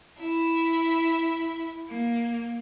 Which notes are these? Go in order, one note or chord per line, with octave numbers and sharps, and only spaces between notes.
E4
A#3